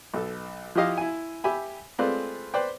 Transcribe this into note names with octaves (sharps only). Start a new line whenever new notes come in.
B1 A4
F3 E4 F4 G4 D#5 F5
E4 G#5
G4 E5 G#5 B5
G#3 A3 C4 F4 B4 D5
B4 C5 D5 G5